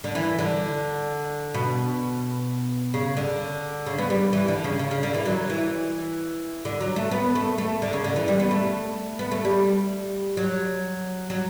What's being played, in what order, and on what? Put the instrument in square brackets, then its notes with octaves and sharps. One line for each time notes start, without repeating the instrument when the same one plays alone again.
[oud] D3
E3
D3
B2
C#3
D3
C#3
B3
G3
E3
D3
C#3
C#3
C#3
D3
E3
F#3
E3
D3
F#3
A3
B3
A3
A3
D3
C#3
D3
E3
G3
B3
A3
B3
A3
G3
F#3
F#3